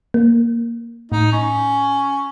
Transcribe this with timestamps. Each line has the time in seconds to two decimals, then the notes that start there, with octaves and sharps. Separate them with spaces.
0.14 A#3
1.12 A2 D#4
1.32 C#4